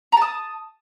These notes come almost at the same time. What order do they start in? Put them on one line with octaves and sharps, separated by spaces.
A#5 A5 D#6